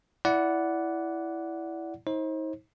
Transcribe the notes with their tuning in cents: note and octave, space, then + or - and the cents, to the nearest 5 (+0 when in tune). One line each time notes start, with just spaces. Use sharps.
E4 +0 D5 -20 F#5 +0
D#4 +40 C5 +35